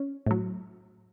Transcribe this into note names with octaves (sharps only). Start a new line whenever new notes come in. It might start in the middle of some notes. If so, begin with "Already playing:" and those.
Already playing: C#4
A2 F#3